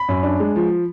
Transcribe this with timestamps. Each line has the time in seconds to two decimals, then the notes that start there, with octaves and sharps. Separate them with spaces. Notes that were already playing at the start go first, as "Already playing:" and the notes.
Already playing: B5
0.09 F#2
0.23 D4
0.40 G#3
0.56 F3